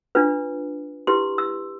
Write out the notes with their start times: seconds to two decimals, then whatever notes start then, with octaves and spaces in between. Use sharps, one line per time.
0.15 D4 F4 B4
1.07 E4 G4 B4 C6
1.38 E6